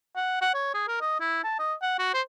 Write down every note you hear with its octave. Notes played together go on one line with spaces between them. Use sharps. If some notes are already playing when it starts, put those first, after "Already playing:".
F#5
F#5
C#5
G#4
A#4
D#5
E4
A5
D#5
F#5
F#4
C5